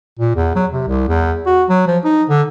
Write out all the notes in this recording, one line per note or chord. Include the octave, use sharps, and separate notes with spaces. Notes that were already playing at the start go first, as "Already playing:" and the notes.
A#2
E2
F#3
C3
C2
E2
F#4
F#3
F3
D#4
D3